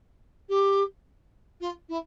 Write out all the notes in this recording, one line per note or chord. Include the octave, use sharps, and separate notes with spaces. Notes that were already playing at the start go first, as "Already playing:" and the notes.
G4
F4
E4